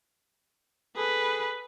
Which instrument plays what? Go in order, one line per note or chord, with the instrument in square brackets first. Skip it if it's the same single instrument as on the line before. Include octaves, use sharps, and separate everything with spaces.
[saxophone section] G#4 A4 [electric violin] B4